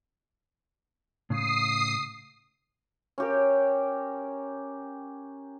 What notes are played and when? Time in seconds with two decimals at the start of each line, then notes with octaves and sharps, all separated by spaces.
1.30 A2 C#3 D#6 C7
3.18 C#4 G4 A#4